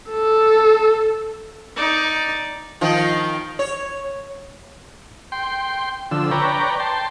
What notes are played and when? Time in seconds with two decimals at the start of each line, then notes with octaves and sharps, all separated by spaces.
0.11 A4
1.76 D#4 D5
2.81 D#3 F3 F4
3.59 C#5
5.32 G5 C6
6.11 D3 F3 E6
6.31 B4 C#5 D5 G5 A#5
6.80 G5 A5 C6